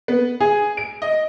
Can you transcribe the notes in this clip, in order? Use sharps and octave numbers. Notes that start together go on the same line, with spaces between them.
B3
G#4
D7
D#5